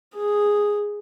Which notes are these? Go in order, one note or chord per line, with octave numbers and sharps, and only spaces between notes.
G#4